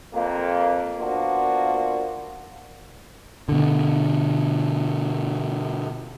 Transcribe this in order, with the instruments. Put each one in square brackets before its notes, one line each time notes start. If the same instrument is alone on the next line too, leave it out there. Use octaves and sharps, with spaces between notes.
[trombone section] F2 A#3
F3 A#3 B3 D4 F4 F#4
[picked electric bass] B2 D3